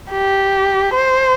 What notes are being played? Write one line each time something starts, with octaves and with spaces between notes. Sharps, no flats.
G4
C5